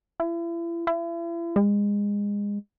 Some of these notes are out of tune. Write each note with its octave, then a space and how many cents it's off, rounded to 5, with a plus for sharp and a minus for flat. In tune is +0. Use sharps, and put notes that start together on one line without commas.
E4 +40
E4 +40
G#3 -25